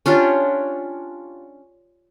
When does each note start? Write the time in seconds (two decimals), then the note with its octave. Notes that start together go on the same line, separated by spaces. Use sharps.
0.06 C#4 D4 F4 G4